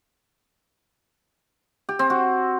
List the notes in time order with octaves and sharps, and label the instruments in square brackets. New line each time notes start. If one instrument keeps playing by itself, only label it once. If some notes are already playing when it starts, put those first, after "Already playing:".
[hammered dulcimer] G4
C4
F#4